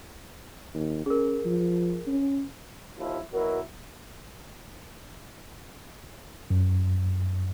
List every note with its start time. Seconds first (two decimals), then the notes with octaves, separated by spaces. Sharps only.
0.74 D#2
1.06 C#4 G#4 A#4
1.46 F3
2.08 C#4
2.98 D#2 F3 E4
3.33 B2 F#3 E4 A#4
6.50 F#2